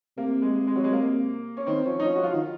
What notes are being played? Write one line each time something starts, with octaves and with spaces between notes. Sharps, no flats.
C3 A#3
G#3
G#3
F#3
G#3
A#3
C#4
D#3 C4
F3 C#4
D#4
F3 C#4
F#4
F3 F4
D#3